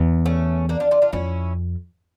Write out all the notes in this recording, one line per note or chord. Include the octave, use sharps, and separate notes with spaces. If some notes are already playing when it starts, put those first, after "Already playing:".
Already playing: E2
A3 C#4
A#3 D4
D4 F4
D4 F4
D4 F4
F2 C#4 E4